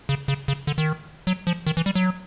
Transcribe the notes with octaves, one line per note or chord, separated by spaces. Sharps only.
C#3
C#3
C#3
D3
D#3
F#3
F3
D#3
E3
G3
F#3